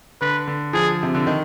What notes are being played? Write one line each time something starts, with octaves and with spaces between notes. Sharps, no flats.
D3 B4
D3
F3 G#4
C3
D3
D#3